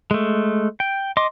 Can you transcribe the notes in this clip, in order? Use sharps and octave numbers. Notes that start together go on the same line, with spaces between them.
G#3 A3
G5
D#5 C6 D6